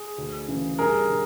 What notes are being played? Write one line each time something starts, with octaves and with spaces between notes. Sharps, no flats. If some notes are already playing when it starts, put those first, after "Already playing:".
Already playing: G#4
D2
C#3 E3
G2 G#4 A#4
D#3